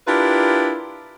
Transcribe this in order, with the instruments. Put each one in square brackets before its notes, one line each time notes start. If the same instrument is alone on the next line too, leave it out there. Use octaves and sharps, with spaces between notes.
[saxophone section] D4 E4 F4 G4 A#4 B4